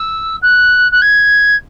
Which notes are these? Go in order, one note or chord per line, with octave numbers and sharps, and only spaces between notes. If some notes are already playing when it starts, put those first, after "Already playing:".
Already playing: E6
F#6
F#6
G#6